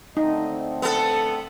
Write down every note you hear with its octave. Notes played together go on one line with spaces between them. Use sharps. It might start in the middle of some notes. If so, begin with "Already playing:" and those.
D3 A3 C4 D#4 D#5
B3 A4 A5